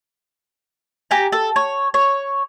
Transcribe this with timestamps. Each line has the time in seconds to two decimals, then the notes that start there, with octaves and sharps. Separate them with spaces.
1.11 G4 G#5 A#5
1.32 A4
1.56 C#5
1.94 C#5